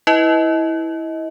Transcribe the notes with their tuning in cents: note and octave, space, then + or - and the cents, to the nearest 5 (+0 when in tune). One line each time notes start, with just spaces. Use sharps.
E4 -10 B4 +0 D#5 +25